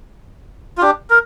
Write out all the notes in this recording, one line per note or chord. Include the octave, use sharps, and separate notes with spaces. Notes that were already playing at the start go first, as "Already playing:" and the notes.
F4
D4 G4
A#4